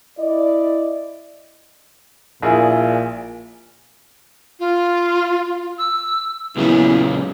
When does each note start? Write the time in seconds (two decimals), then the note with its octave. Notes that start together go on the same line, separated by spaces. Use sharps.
0.18 E4 D5 D#5
2.43 A#1 A#2 E4 G#4
4.59 F4
5.78 E6
6.57 E2 A#2 C#3 F#3